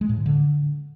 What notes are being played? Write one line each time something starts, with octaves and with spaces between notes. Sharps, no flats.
G#3
A2
D#3
D3